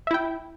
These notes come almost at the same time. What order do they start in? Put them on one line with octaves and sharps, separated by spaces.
E5 E4 G5